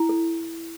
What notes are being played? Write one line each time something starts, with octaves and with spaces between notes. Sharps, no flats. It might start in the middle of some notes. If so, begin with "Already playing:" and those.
Already playing: E4
A4